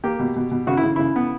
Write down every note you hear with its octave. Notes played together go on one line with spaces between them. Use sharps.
A#3 G4
B2
B2
B2
C#3 F#4
E4
C#3
C#3 E4
B3